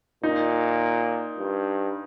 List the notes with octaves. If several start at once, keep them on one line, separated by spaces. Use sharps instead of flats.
A#2 D#4
G2